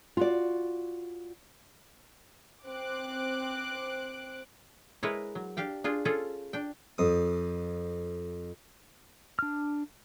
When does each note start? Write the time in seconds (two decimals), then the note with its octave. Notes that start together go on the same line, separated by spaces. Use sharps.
0.17 F4 F#4 D5
2.65 C4 D6 F#6 D7
5.03 G#3 E4 G#4 A#4 B4 C#5
5.35 F#3
5.57 D4 G4 F5 G5
5.84 D4 F4 G#4
6.05 C#4 F4 G#4 A4
6.53 D4 G5
6.98 F2 D#6
9.39 D4 F6